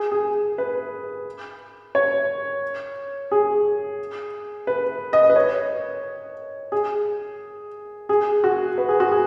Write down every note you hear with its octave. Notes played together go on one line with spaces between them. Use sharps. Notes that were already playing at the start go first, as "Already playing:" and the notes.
Already playing: G#4
G#4
B4
C#5
G#4
B4
D#5
B4
C#5
G#4
G#4
F#4
B4
G#4
F#4
G#4